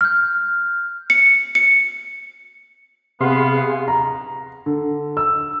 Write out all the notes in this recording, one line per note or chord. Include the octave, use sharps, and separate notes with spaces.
F6 G6
C#7
C#7
C3 B3 G#4 F5 C6
A#5
D3
E6